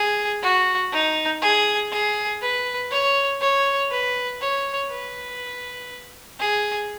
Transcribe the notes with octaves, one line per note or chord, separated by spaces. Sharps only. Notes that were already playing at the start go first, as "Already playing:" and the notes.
Already playing: G#4
F#4
D#4
G#4
G#4
B4
C#5
C#5
B4
C#5
B4
G#4